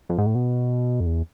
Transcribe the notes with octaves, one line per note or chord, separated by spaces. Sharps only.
F2
G#2
A2
B2
F2
E2